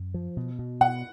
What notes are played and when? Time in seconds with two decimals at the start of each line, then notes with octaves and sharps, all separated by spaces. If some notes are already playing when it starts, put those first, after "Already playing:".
Already playing: F#2
0.14 F3
0.37 B2
0.59 B2
0.80 B2 F#5